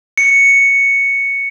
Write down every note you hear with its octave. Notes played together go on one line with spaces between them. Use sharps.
C#7